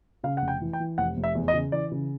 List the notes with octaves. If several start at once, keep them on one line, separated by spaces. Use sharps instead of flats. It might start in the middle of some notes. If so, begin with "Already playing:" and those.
C#3 F5
F1 F#5
G5
E3
G5
E3
F1 F#5
F1
E5
E2
D#5
C#3
E3 D5
C#3